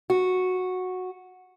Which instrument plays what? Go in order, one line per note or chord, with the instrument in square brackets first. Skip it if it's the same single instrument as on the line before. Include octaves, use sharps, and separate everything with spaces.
[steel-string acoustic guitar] F#4